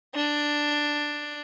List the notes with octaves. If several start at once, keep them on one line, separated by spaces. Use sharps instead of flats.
D4